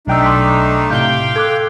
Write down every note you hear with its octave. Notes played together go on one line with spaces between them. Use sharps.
B1 A3 D4 D#4 G5 E6
C6 D6 B6
A2 C3 F5 G5 G6 G7
A4 D6 F#6 G#6